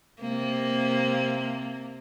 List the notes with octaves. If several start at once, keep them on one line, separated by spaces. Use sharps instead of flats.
C3 A#3